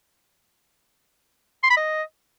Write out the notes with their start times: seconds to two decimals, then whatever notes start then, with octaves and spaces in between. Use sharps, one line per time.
1.63 C6
1.70 B5
1.77 D#5